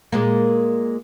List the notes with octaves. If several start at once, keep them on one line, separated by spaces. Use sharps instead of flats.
A#2 G#3 A#3